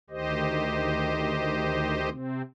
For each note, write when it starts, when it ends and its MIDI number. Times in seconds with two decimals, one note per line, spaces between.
0.10 2.09 38
0.10 2.09 51
0.10 2.09 67
0.10 2.09 72
0.10 2.09 75
2.10 2.42 48
2.10 2.42 60